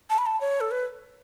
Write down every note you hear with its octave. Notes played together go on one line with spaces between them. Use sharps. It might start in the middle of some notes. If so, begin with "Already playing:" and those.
A5
B5
A5
C#5
A4
B4